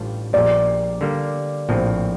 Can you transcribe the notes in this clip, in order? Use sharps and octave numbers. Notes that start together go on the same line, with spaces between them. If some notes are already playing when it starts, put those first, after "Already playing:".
Already playing: A1 A2 G3 D4 F4
A#1 A#2 G3 D5
D3 G3 A#3
A#1 A2 F3 C4